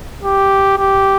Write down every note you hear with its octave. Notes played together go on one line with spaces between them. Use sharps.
G4
G4